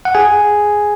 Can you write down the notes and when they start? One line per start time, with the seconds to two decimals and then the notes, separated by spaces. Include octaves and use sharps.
0.05 F#5
0.15 G#4 G#5